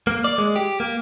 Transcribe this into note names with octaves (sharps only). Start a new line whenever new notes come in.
A#3
D5
G#3
G4
A#3